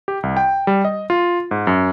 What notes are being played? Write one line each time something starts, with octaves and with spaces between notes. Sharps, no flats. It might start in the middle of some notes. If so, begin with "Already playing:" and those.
G4
C2
G5
G3
D#5
F4
G#2
F#2